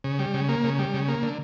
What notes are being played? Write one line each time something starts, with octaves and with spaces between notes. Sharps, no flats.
C#3
G3
C#3
A#3
C#3
G3
C#3
A#3
D3